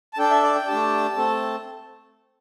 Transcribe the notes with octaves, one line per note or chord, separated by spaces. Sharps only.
A5
D4 A4 G5
E5
D5
G5
A3 D4 G4 A5
A3 C4 A4